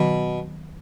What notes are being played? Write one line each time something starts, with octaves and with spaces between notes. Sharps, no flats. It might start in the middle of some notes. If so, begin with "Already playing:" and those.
Already playing: B2 D#3 F#3 B3